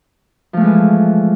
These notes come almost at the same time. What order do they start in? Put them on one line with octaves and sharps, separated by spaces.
F3 A3 G#3 E3